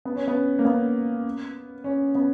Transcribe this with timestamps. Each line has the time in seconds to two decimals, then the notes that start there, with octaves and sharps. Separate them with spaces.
0.05 B3
0.16 C#4
0.28 B3
0.59 A#3
0.65 B3
1.84 C#4
2.15 B3